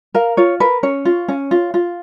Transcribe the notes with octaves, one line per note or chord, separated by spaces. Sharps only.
A#4 F5
F4 C#5
A#4 B4
C#4 C#5
F4
C#4
F4
F4